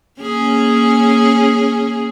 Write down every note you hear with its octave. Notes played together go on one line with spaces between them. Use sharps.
A#3 C#4 G#4